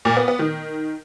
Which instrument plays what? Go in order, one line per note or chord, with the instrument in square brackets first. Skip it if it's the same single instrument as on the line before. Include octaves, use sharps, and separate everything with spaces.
[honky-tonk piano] A#2
B3
B3
D#3